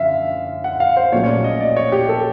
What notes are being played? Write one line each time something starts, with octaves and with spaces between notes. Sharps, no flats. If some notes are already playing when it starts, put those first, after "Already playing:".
Already playing: F#2 D3 F3 C#4 E5 F5
F#5
F5
C5
A#1 A#2 F#3 A3 C#4 C#5
C#5
D5
D#5
D5
C#5
G4
A4